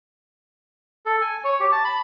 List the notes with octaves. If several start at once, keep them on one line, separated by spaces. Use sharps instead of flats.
A4
G#5
C#5
G4
A5
B5